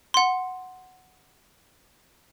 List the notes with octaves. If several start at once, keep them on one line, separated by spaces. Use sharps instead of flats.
F#5 C6